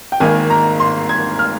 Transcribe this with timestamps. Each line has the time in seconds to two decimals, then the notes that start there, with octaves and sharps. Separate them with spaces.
0.12 G5
0.20 G#1 G#2 D#3 A#3 G#5
0.50 A#5
0.80 C6
1.09 G#6
1.39 F6